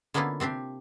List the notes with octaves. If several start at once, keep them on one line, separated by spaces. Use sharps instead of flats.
D3 A#3 B3 C#4 E4 F4
C3 C4 D4 G4